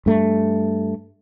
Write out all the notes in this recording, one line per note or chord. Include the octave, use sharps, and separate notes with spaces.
G2 A3